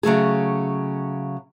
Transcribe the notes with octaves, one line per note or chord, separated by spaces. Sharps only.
C#3 F#3 A3 G#4